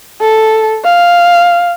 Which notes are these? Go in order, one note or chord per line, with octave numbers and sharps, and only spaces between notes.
A4
F5